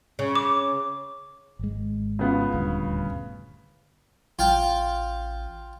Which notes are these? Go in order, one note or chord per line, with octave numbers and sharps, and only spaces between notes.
C#3
D6
G#1 G#3
C#3 B3 F4
D#1 D2 G2
A1 F4 F5 G5